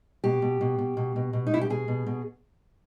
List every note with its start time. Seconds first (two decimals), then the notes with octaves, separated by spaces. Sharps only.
0.24 B2 G4
0.42 B2
0.61 B2
0.78 B2
0.97 B2
1.16 B2
1.33 B2
1.47 D#4
1.51 B2 E4
1.61 G4
1.70 B2 G#4
1.88 B2
2.06 B2